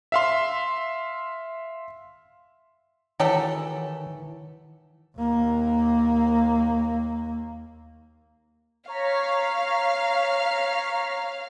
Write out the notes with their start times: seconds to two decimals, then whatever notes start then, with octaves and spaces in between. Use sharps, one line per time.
0.12 E5 F5 C6
3.20 D#3 E3 E4 F#4 G4 A4 C#5 E6
5.18 D#2 A#3
8.87 C#5 F5 A#5 B6